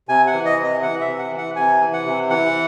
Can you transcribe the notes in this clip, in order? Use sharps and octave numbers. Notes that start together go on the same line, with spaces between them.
C3 G#5
F#5
E3
D#5
C3
D#5
E3 F#5
E5
C3
F#5
E3
F#5
C3 G#5
E3
F#5
C3
E3 F#5